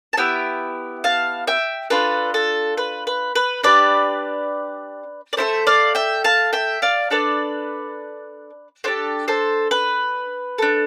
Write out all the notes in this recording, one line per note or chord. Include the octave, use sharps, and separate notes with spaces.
A5
B3 E4 G4 E5 G5
F5 A5
E5 G5
D4 F4 A4 B4
A4
B4
B4
B4
D4 G4 B4 D5
D5
A3 E4 A4 C5 E5
D5 F5
E5 G5
F5 A5
E5 G5
D5 F5
D4 A4 B4 D5
D4 G4 A4 C5
A4 C5
B4
D4 A4